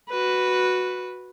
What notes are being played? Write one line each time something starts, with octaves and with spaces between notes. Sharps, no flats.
F#4 B4